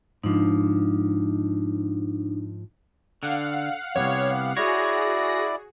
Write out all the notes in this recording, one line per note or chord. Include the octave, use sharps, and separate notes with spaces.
G#2 F3 D4 D#4
D3 F5 F#5
C2 F2 B3 G4 C#5
E4 F#4 G#4 C#5 D5 A#6